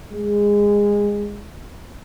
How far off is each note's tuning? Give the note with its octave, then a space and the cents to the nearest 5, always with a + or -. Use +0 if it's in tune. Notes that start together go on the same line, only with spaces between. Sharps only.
G#3 -20